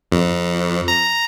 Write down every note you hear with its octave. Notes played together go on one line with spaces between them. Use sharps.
F2
A#5